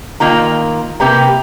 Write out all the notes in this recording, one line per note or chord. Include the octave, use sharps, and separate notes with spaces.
D#3 A#3 F4 A#5
C3 A#3 G4 B4 A#5